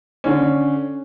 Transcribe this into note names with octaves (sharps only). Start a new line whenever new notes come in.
D3 C#4